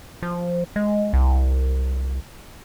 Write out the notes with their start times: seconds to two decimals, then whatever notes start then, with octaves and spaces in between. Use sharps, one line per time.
0.22 F3
0.76 G#3
1.13 C2